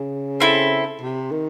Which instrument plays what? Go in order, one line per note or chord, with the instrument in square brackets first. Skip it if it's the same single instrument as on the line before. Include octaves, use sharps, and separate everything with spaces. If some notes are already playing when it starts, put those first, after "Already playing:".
Already playing: [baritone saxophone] C#3
[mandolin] C4 E4 A4
[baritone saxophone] C3
D#3